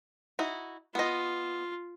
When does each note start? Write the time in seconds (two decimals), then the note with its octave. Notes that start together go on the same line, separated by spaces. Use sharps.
0.39 D#4 E4 F#4
0.95 B3 F4 D#5